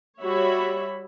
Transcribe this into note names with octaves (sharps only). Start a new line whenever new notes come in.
G3 F#4 C#5 E5 B5